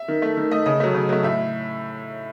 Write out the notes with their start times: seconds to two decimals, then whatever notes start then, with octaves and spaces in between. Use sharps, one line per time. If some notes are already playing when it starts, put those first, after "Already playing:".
Already playing: E5
0.08 D#3
0.22 A3
0.37 D#3
0.51 A3 D#5
0.66 C#3 D#5
0.80 F#3 A3
0.94 C#3
1.09 F#3 A3
1.23 A2 E5